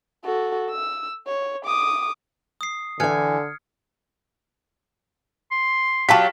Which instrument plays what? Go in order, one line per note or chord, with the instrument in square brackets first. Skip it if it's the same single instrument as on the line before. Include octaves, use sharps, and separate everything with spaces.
[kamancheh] F#4 A4
E6
C#5
D6 D#6
[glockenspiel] D#6 C7
[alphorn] D3 [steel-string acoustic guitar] E3 G#5 [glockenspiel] F6 G#6 C#7
[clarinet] C6
[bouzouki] F#3 F4 G4 [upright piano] F5 A5 B6